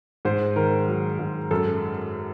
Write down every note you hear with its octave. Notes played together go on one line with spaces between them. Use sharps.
G#2 C5
D#3 A#4
F#3
G#2
F#2 A4